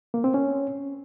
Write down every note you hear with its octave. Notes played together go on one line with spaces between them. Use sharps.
A#3
C4
C#4